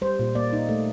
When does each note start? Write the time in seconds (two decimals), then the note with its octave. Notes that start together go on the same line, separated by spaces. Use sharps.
0.02 G3 C5
0.19 A#2
0.35 A#3 D5
0.53 D#4
0.69 A3